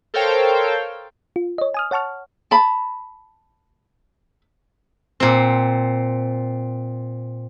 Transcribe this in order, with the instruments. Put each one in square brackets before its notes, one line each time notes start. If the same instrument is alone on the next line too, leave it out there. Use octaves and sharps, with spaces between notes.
[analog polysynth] A4 A#4 C5 C#5 F5 G5
[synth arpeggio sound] F4
C#5 D#5
G#5 D#6 F6
C#5 F#5 A5 C#6 F6
[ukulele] A5 B5
[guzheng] A#2 C4